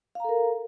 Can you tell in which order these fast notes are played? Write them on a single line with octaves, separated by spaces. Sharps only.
F5 A#5 A4 A#4